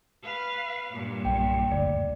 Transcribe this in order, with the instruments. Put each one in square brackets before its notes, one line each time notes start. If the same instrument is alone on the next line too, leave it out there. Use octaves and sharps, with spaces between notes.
[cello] B4 F5
G2 A#2
[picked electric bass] B1 [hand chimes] G5
[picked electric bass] F#1 D2 [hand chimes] D5